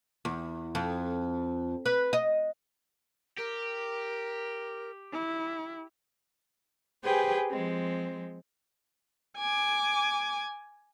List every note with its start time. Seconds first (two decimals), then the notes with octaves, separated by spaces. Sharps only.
0.25 E2
0.75 F2
1.86 B4
2.13 D#5
3.38 G4 A#4
5.13 E4
7.04 G4 G#4 B4 C5 G5 G#5
7.50 F3 G#3 C4
9.38 G#5 D6